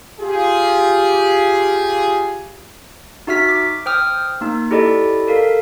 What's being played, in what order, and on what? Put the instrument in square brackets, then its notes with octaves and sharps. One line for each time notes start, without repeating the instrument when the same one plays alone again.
[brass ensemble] F4 G4 G#4
[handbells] D#4 F#4 E5 F6 B6
D6
C5 G5 D#6 F6
A#3 D#4
E4 G4 A4 D5 D#5
A4 A#4 F5